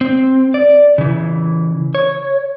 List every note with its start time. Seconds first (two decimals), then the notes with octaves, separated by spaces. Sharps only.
0.01 C4
0.54 D5
0.98 C#3 E3
1.95 C#5